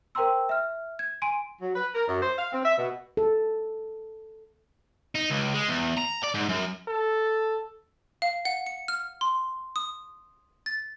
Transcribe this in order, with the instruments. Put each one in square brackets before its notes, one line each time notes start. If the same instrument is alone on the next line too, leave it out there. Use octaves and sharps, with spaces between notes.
[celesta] A#4 C5 G5 A#5 C6 E6
E5 F6
G#6
G#5 C6 D7 D#7
[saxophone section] F#3
B4
A#4
F#2
C5
F5
C4
E5
B2
[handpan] A4
[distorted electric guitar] D#4
C#2
G#3
E2
A#5
D5
G#2
F#2
[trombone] A4
[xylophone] F5
F#5
C#7
F6
C6
D#6
A6